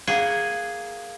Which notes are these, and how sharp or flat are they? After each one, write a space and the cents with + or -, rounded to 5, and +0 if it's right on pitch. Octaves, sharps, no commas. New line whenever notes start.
A#3 -5 G#4 +0 F#5 +15